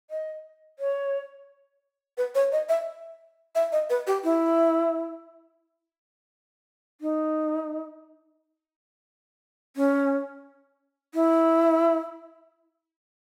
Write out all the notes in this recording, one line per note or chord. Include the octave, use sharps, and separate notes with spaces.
D#5
C#5
B4
C#5
D#5
E5
E5
D#5
B4
G4
E4
D#4
C#4
E4